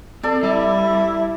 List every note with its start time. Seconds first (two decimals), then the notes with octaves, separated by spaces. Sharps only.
0.23 C4 A4 D5
0.43 G3 E4